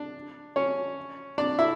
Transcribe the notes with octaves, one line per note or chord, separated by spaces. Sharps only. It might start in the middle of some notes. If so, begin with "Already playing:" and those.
Already playing: D4
C#4 C#5
D4 D5
E4 E5